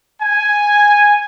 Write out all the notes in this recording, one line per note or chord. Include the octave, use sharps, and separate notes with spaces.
G#5